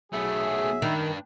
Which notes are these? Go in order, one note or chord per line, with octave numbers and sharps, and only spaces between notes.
B1 F#3 A3 B3 G#4 E5
D#3 D4 B4